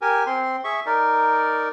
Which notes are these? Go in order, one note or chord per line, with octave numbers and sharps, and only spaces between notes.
G4 A#4 G#5
C4 C6
G#4 E5 C#6
D#4 A#4 D5